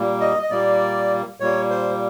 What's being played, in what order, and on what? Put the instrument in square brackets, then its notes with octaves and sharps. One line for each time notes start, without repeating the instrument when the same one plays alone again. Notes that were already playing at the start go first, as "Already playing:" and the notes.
Already playing: [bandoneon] A#2 G3 A#3
D#5
D#5
A#2 G3 A#3 D5
A#2 G3 A#3 C#5
C5